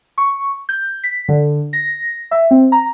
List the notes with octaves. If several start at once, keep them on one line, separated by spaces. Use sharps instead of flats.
C#6
G6
B6
D3
A#6
E5
C4
A#5